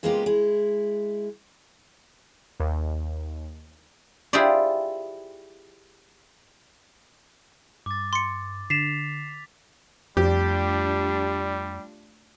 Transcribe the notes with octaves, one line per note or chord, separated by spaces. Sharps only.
C#3 G#3 A#3 B3 F4 G4
G#3 E4
D#2
E4 F4 G4 G#4 C5 D5
G2 D6 A6
C6 C#7
D3 A6 B6 C7 E7 F7
F2 G3 A3 D4 F4 G4